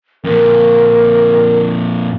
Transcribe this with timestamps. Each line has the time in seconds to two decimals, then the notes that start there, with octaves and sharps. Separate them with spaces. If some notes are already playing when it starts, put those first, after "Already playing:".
0.24 F2 A#2 A#4